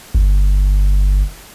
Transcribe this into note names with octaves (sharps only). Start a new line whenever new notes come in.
G1